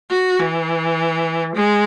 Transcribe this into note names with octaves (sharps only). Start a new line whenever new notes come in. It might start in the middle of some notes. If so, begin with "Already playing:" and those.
F#4
E3
G#3